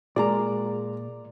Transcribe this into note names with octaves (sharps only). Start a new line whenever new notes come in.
A#2 G#3 A#3 D5 A#5